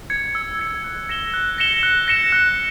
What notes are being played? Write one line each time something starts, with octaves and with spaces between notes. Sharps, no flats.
G#6 C#7
E6
G#6 C#7
F#6
A#6 C#7 E7 G7
F#6
A#6 C#7 E7 G7
F#6
A#6 C#7 E7 G7
F#6